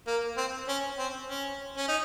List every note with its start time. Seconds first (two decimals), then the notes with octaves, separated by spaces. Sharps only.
0.07 A#3
0.37 C4
0.68 C#4
0.98 C4
1.27 C#4
1.77 C#4
1.88 D#4